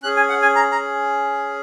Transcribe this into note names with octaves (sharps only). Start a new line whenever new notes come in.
C#4 G#4 F#6
G#5
F#5
G#5
A#5
A#5